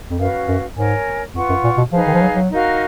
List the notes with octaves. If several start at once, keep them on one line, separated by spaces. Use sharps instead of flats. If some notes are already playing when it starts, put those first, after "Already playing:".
F2
F#2 C#4 F#4 B4 F5
F#2
G#2 A#4 C#5 G#5
F2 F4 B4 F#5 C#6
F#2
A#2
B2
F3 D#4 G#4 B4 F5
D#3
F3
F#3
F#3
D#4 F#4 A#4 F5